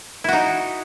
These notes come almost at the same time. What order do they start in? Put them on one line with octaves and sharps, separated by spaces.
E4 F#4 D#4